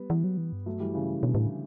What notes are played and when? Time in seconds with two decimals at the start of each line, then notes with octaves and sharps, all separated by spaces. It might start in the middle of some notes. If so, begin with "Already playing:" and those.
Already playing: G3 B3
0.10 E3
0.24 F#3
0.37 E3
0.53 G2
0.66 F#3 A3
0.80 E3 G3
0.94 C#3 E3
1.23 B2 D3
1.35 A2